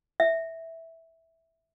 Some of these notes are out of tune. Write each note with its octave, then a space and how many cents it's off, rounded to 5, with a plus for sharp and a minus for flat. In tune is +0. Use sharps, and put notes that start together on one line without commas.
E5 -10